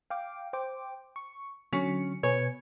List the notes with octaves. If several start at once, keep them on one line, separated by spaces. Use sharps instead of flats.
F5 G5 D6
C5 G5 D6
C#6
D3 F#3 C#4 C#7
B2 B4 C#5 G#5